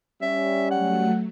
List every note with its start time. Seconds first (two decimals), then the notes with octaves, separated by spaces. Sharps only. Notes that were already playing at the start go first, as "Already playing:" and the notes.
0.22 G3 C#4 E5
0.71 F#3 A3 F#5